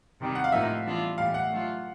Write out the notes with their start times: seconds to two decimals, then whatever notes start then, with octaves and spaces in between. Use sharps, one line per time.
0.21 C3 D#3 G3
0.35 F#5
0.44 F5
0.52 A2 F3 A#3 D#4 E5
0.85 E3 G3 B3 D4 F4
1.18 A2 E3 G3 F5
1.34 F#5
1.50 F#3 A3 D4 F4